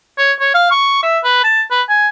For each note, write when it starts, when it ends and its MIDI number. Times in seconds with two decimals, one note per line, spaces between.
0.18 0.32 73
0.40 0.52 73
0.54 0.67 77
0.71 0.99 85
1.03 1.18 76
1.24 1.43 71
1.44 1.62 81
1.71 1.82 71
1.89 2.09 80